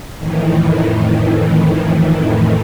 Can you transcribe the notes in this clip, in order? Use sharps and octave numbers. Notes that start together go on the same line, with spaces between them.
F2 A2 D#3 E3